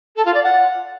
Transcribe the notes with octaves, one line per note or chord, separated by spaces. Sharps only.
A4
F4
D5
F#5